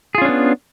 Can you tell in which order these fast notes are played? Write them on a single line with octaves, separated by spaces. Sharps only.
G#4 F4 C#4 D4 B3